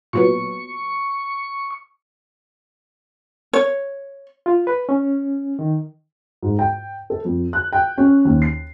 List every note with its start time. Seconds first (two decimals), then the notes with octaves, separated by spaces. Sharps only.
0.13 A#2 F#3 B3 C#6
3.53 C#5
4.46 F4
4.67 B4
4.89 C#4
5.59 D#3
6.42 G#2
6.59 G5
7.10 A4
7.25 F2
7.53 F#6
7.73 G5
7.98 C#4
8.25 D#2
8.42 C7